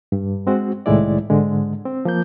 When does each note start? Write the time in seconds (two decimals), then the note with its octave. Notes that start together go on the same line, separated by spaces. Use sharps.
0.12 G2
0.47 G#3 C4 F#4
0.86 C2 A2 D#3 G#3 E4 D5
1.30 G#2 D3 G#3
1.85 C4
2.05 F3 A#3 G6